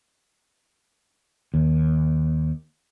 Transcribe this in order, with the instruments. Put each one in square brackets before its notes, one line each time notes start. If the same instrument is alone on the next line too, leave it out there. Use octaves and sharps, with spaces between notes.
[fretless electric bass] D#2